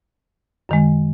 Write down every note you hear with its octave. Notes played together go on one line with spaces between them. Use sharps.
F#2 D#3 G#3